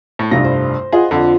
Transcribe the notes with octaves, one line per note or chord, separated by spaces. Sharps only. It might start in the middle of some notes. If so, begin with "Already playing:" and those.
A2
F1 C2 G2 F4 A#6
C5
F4 G#4 D#5 F#5
F2 D3